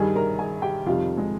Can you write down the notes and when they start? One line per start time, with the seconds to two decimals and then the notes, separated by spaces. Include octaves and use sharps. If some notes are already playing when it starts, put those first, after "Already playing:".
Already playing: G2 D#3 G3 G#4 G#5
0.15 A#4 A#5
0.39 G#4 G#5
0.62 G4 G5
0.86 F2 C3 D#3 G3 F4 F5
1.17 G#3 G#4